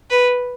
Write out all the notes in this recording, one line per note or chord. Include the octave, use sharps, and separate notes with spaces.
B4